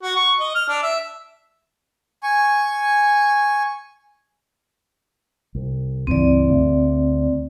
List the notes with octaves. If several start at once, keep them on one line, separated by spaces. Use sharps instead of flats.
F#4
C#6
D#5
F6
D4
E5
G#5 C#6
C2
C#2 G2 E3 C4 D5
D2